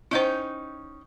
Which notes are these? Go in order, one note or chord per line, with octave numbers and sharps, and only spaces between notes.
C#4 D#4 E4 C5 G5